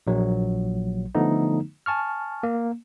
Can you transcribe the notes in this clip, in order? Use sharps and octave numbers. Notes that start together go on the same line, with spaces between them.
A#1 F#3
D3 F3 A3 B3 D#4
G#5 A5 C#6 F6
A#3